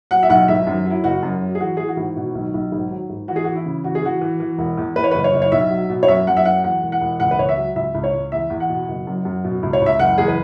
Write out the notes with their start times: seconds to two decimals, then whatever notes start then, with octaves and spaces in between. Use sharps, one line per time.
0.11 F#3 F#5
0.23 E5
0.30 B1 F#5
0.48 G#1 E5
0.67 F#2
0.85 F#3
0.90 E4
1.04 F#1 F#4
1.23 F#2
1.42 F#3
1.55 G#4
1.60 E3 F#4
1.77 E3 G#4
1.88 F#4
1.97 G#1
2.16 B2
2.35 B1
2.54 B1
2.72 G#1
2.91 F#3
3.09 G#1
3.28 E3 F#4
3.36 G#4
3.44 E3 F#4
3.56 E4
3.66 C#3
3.84 E3 F#4
3.95 G#4
4.02 E3 F#4
4.21 E3
4.40 E3
4.58 E1
4.77 E2
4.96 E2 B4
5.04 C#5
5.11 F#1 B4
5.24 C#5
5.33 F#1
5.42 C#5
5.52 B1 E5
5.71 F#3
5.90 B2
6.03 C#5
6.08 F#2 E5
6.27 F#2 F#5
6.37 E5
6.45 F#3 F#5
6.64 E2 F#5
6.82 E1
6.92 F#5
7.01 E1
7.20 C#2 F#5
7.31 B4
7.39 C#2 C#5
7.49 E5
7.57 F#3
7.76 C#2 E5
7.95 C#2
8.04 C#5
8.14 C#2
8.32 E2 E5
8.50 E2
8.60 F#5
8.69 B2
8.88 F#1
9.07 F#2
9.25 F#2
9.44 B2
9.63 C#2
9.73 C#5
9.82 C#2 E5
10.00 F#1 F#5
10.18 E2 G#4
10.28 B4